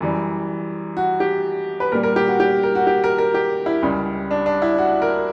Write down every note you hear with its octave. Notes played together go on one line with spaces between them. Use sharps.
F#2 E3 G3
F#4
G4
B4
A#2 G3 A#4
A#4
G4
F#4
G4
A#4
F#4
G4
A#4
A#4
G4
E4
C#2 C#3 G3
D4
D4
E4
F#4
A#4